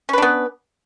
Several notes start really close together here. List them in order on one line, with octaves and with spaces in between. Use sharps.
C#4 B4 D4 B3